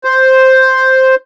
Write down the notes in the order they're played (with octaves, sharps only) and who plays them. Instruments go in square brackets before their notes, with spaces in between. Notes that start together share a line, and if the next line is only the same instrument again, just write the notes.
[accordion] C5